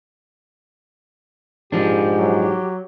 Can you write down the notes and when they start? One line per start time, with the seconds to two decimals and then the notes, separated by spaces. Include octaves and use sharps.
1.72 G#2 F3 D4 G4
2.18 F#3